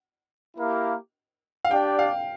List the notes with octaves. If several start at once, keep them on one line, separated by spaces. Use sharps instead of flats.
A#3 E4 G4 A#4 F5
F5
D4 G4 D5 G5
F5